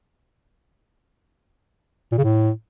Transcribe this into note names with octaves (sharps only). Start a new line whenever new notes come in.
A#2
C#3
A2